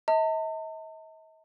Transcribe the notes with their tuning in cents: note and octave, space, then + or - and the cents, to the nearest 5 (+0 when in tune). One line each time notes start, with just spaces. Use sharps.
D#5 +45 A5 +45